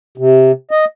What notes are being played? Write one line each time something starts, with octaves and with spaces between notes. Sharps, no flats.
C3
D#5